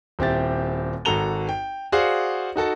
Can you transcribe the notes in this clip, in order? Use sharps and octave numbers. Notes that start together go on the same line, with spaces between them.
D#1 C4 E4 G4 A6
G#1 F#4 A4 A#5 F7 G7
G5
F#4 G#4 C5 D5 F5 F#5
D#4 F#4 A4 A5